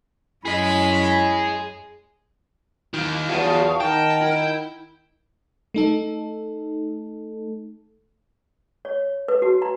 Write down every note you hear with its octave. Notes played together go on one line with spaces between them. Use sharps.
F#2 C#4 E4 G#4 D#5 B5
D#3 A#3 E4
E2 F3 F#3 F5 A5 C#6 D#6
D#3 A#4 F#5 G5 A5 A#5
E4
A3 D#4 A4
C#5
B4
F#4
A#5